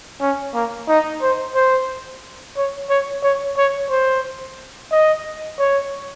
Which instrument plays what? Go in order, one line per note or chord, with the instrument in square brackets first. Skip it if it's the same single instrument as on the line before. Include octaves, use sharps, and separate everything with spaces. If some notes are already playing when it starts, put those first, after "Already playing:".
[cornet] C#4
A#3
D#4
C5
C5
C#5
C#5
C#5
C#5
C5
D#5
C#5